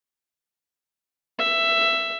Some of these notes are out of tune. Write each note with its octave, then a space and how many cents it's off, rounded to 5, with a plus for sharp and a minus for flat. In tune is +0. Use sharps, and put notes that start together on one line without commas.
E5 +10